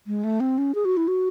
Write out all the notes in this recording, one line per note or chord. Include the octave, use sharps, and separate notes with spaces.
G#3
A3
C4
C#4
G#4
F#4
E4
F#4